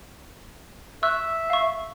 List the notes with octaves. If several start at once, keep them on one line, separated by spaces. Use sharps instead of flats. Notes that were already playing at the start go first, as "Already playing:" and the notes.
E5 C#6 E6 F#6
F5 C#6